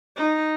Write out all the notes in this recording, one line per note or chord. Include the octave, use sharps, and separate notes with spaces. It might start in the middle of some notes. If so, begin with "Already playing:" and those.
D#4